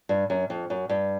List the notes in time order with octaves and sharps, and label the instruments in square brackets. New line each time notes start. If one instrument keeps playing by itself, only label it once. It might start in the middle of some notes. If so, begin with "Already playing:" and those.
[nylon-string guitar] G2
F#2
F2
F#2
G2